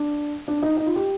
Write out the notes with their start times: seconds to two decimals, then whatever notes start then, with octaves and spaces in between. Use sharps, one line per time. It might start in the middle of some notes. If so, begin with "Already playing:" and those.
Already playing: D4
0.48 D4
0.62 D#4
0.77 D#4
0.86 F4
0.96 G4